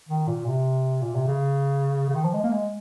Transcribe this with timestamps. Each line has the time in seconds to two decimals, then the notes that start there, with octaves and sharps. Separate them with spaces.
0.09 D#3
0.28 A#2
0.46 C3
1.02 A#2
1.15 C3
1.28 C#3
2.09 C#3
2.15 D#3
2.25 F3
2.34 G#3
2.44 A#3
2.53 G#3